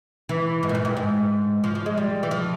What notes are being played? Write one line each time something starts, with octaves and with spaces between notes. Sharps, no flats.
E3
G#2
A#2
G#2
G2
G#2
F3
F3
G#3
G3
E3
F3